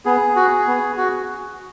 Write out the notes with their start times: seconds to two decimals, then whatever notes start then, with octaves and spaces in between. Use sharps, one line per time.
0.06 B3 G#4
0.36 F#4
0.67 B3
0.97 F#4